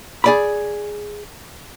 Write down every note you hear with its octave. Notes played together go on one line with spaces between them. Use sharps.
G#4 D5 B5